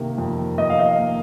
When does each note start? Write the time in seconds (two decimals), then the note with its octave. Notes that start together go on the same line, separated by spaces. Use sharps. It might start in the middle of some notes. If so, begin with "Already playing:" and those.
Already playing: C3 D#3 A#3
0.18 F2
0.58 F2 D#5
0.70 F5
0.79 D#5
0.98 A#3